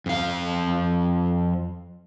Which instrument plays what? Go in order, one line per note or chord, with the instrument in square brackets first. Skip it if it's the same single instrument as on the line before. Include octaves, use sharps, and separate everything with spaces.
[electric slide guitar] F2 F5